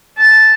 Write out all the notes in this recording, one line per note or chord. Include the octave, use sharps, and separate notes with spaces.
A5